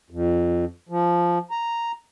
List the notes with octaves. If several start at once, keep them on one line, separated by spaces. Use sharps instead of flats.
F2
F3
A#5